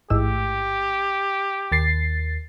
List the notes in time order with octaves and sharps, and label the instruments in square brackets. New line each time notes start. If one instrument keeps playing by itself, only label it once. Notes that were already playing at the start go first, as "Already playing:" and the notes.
[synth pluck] A1 G#2 E6 [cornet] G4
[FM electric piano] D#2 A6 C7